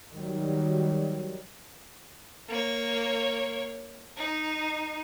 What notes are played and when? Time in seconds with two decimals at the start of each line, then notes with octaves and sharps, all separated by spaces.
0.13 D#3 F#3 G3
2.49 A#3 C#5
4.17 D#4